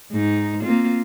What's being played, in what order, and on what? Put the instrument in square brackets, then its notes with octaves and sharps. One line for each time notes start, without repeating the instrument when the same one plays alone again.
[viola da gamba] G#2 D#4
A#3 C4 F4